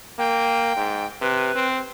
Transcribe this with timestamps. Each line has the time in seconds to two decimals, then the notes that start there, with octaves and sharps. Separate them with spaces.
0.19 A#3 G5
0.76 G#2
1.21 C3 B4
1.55 C4